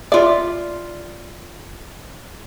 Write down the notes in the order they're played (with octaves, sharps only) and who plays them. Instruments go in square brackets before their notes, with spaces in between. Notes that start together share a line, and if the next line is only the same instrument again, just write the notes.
[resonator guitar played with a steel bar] F4 E5 [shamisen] D5